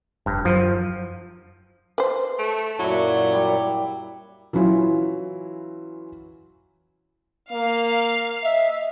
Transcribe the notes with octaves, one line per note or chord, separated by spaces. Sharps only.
F1 G2
F#2 F3 F#3
B4 C5
A3
F#2 A#2 F#3 E4 D5 E5
G3
E3 F#3 C#4 E4 F4
A#3 F5
D#5 E5